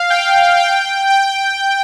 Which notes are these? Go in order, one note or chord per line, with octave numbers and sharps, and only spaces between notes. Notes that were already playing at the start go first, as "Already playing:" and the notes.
Already playing: F5
G5
G5
G5